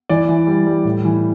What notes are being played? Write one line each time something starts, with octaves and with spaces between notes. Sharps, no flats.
E3 D5
E3
G3
G3
A2
E3